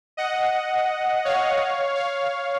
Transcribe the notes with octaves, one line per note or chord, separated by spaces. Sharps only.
D#5 F#5
C#5 F5
C#5 F5